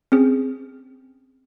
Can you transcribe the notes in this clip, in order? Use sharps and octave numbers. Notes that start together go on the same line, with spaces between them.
C4 C#4 G#4